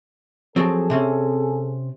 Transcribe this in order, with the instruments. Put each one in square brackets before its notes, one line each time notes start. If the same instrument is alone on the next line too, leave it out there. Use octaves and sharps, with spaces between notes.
[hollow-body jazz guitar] F3 F#3 C4 [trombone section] G#4 A4
[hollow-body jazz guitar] C3 C4 C#4